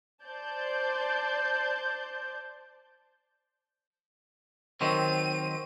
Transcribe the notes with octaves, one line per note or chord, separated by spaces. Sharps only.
C5 D5 A5 G6
D#3 F#3 C4 C5 D#7